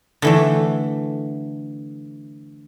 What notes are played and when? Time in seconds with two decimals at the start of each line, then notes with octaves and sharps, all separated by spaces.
0.22 D3 E3 A3